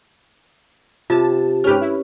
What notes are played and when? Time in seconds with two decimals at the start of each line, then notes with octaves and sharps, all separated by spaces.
1.10 C3 F4 A5
1.64 G#2 C#4 G4 B4 F6
1.81 E4